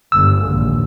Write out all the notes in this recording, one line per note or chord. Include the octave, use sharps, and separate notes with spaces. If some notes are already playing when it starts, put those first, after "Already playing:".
G1 G#2 E6
A#1 D#2